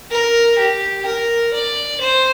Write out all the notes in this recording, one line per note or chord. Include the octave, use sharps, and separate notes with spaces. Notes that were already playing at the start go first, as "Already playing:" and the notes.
A#4
G4
A#4
D5
C5